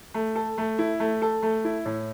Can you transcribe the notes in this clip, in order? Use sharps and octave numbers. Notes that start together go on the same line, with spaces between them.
A3
A4
A3
E4
A3
A4
A3
E4
A2